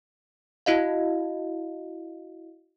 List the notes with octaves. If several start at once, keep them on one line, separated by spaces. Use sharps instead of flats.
E4 F#4 D#5 F5